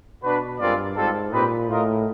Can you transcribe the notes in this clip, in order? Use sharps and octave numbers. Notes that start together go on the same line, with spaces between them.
B2 D4 F#4 B4
G2 G#3 C4 F4 A#4 D5
G#2 G3 C4 F4 A4
A#2 C4 D#4 G4 B4
A2 F4 A#4 D#5